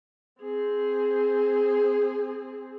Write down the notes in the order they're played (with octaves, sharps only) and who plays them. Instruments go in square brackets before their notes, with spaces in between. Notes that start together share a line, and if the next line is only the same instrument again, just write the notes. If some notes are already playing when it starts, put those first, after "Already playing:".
[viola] C4 G#4